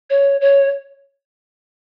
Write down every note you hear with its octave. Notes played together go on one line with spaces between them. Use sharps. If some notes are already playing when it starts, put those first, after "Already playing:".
C#5
C#5